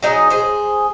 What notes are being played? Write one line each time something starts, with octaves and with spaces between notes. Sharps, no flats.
F#3 D#4 G#4
G#4 C5